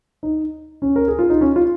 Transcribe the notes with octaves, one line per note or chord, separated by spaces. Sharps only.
D#4
C#4
A#4
G#4
F4
D#4
C#4
F4